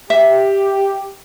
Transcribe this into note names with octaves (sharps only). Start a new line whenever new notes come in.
G4 E5